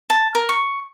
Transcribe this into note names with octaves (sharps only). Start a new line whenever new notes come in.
A5
A#4
C#6